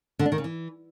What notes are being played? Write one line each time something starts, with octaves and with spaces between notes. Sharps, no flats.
D3
D4
D#3
C#3
E3